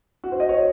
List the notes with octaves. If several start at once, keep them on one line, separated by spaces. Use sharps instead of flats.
F#4
C5
D#5
C#5